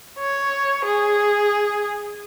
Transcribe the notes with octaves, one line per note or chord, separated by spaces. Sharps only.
C#5
G#4